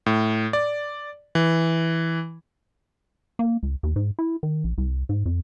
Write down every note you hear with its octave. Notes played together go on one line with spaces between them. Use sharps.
A2
D5
E3
A#3
C#2
D#2
G#2
E4
D#3
A#1
C2
G#2
F2